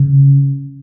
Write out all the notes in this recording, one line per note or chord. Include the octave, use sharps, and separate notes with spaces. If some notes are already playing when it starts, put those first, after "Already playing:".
Already playing: C#3